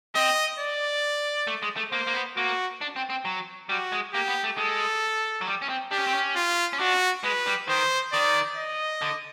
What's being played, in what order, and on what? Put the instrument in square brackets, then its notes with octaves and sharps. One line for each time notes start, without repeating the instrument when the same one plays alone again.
[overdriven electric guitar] C4 [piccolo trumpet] D#5
[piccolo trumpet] D5
[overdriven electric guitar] A3
G#3
A3
[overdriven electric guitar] A#3 [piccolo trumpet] C5
[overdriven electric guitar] A#3
B3
[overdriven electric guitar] A#3 [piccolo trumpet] F#4
[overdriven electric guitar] D4
C4
C4
F#3
[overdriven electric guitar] G3 [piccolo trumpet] F#4
[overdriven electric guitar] G#3
[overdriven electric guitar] A#3 [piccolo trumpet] G4
[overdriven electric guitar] B3
A3
[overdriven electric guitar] G#3 [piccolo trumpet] A4
[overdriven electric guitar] F#3
G3
C#4
C4
[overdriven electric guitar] D4 [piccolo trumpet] G4
[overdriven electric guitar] C#4
C4
C#4
[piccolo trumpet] F4
[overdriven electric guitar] C#4
[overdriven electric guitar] D4 [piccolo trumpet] F#4
[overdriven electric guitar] G#3 [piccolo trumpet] B4
[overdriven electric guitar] G3
[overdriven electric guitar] D#3 [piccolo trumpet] C5
[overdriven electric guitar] D#3 [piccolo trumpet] D5
[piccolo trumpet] D#5
[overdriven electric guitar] D3